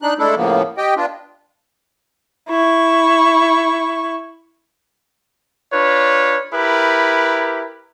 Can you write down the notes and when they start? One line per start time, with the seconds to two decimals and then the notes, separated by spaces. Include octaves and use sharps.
0.02 D4 D#4 F#6
0.19 G#3 A3 D4 E4 A4
0.37 A2 C#3 F3 A#3 B3
0.78 G4 D#5 G5
0.97 B3 D4 F4
2.49 E4 C#6
5.72 D4 F4 B4 C#5
6.52 E4 G4 A#4 B4